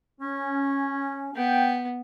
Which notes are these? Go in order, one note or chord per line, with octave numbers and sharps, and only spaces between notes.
C#4
B3 G5